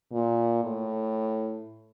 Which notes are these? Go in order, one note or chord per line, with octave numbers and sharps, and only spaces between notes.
A#2
A2